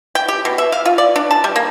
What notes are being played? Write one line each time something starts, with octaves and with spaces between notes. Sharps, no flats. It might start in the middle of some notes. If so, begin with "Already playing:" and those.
G5
G4
B2
E5
F5
F4
D5
D4
A5
G3
A#3